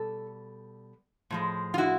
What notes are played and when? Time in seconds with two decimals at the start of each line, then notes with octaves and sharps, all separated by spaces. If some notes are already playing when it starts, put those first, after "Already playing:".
Already playing: B2 G3 A4
1.31 A2 F3 G#3
1.74 F4
1.78 E4 F#4